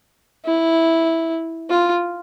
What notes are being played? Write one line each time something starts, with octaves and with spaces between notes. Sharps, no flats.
E4
F4